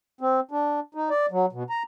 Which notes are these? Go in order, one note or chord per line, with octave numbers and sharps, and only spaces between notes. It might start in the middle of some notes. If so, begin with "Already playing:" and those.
C4
D4
D#4
D5
F#3
B2
A#5